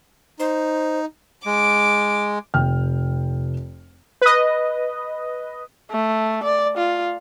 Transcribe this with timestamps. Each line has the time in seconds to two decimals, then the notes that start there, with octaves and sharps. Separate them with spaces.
0.40 D#4 C5
1.46 G#3 D6
2.54 F1 G5 F6
4.22 B4 D#5
5.91 A3
6.44 D5
6.77 F4